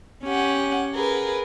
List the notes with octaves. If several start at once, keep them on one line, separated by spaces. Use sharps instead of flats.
C#4 G4 F#5
G#4 A#4 B4